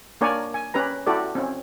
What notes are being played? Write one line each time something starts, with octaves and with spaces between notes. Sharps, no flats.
A#3 D4 A#4 C#5 D5 G#5
G#5
C#4 G4 B4 A#5
E4 F#4 G4 A4 D5
C4 C#4